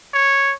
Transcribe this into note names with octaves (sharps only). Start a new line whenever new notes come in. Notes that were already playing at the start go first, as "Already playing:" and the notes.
C#5